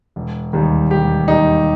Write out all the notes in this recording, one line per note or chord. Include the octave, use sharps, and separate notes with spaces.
E1
D#2 D#3 G3
E1 G4
D#2 D#3 G3 D#4